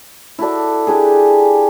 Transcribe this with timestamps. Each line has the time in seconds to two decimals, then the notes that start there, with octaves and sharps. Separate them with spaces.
0.39 E4 F#4 A4 D5
0.87 D4 G4 G#4